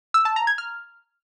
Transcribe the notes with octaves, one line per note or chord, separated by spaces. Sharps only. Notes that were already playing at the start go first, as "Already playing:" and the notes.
E6
A5
A#5
G#6
F6